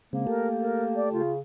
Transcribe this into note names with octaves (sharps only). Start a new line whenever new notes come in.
C#3 G#3 A#3 C4
A3 G4 A4 A#4
A#4
D5
C#3 F4